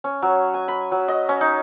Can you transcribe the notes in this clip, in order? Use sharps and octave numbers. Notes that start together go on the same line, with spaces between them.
C#4
F#3
G#5
B5
F#3
D#5
C#4
D#4